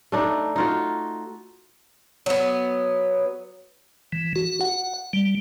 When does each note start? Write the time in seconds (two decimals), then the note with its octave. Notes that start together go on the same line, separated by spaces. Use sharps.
0.12 A3 D4 D#4
0.56 D#4 F4 F#4
2.26 F#3 B3
4.13 E3
4.36 F#4
4.61 F#5
5.13 G3